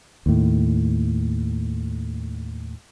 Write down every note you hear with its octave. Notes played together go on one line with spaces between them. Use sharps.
D#2 A2